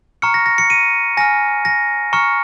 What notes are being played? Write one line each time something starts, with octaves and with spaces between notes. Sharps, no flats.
A#5 C#6 F6 C#7
A#6
A#6
C#7
D#7
G#5 F6 A#6
A#6
A#5 C#6 F6 C#7